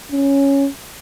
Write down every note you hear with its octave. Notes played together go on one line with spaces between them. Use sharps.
C#4